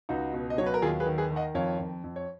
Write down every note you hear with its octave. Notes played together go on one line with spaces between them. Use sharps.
C#2 D#4 F#4
B2
D#5
F#3 C#5
B4
A#4
D#2 F4 G#4
G#4 B4
D#3
G#4 B4
D#3
D#5 F#5
F2 C#5 F5
F2
F2
C#5